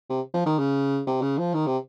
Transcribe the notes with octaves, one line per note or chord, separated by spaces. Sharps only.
C3
F3
D#3
C#3
C3
C#3
F3
D#3
C3